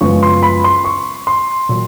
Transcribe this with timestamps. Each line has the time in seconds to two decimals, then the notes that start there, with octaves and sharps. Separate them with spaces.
0.01 F#2 C#3 F3 G#3 B3 C#6
0.23 C6
0.43 B5
0.64 C6
0.85 C#6
1.27 C6
1.69 A#2 F#3